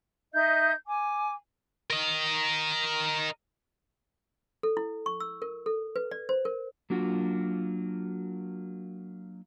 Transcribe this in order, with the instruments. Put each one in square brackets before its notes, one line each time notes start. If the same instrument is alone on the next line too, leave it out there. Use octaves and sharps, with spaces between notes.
[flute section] D#4 D#5 E5 G6
G#5 D6
[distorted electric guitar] A#4 D#5
[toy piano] A4
E4
C#6
E6
A#4
A4
B4
D5
C5
A#4
[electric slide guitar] F#3 A#3 D4 F4 F#4